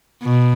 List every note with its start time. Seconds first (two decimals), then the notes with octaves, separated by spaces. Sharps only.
0.23 B2